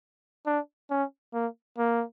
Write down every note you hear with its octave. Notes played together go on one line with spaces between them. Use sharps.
D4
C#4
A#3
A#3